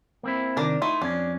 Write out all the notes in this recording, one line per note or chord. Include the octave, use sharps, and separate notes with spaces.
A#3 C4 E4
C3 D#3 D4 A#4 D5
A3 D#4 E4 C6
F2 C#4 D4